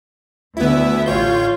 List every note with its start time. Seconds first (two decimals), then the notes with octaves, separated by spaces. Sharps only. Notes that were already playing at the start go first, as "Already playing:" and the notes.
0.57 D2 B3 E4 E5
1.06 A1 F4 C#5 G6